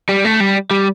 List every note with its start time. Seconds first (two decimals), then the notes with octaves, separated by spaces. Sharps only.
0.09 G3
0.25 A3
0.40 G3
0.71 G3